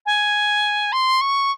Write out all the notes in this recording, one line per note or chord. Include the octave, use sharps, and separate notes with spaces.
G#5
C6
C#6